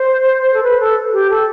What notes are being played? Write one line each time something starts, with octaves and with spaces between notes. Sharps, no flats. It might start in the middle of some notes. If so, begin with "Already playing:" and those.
Already playing: C5
A4
B4
A4
G4
A4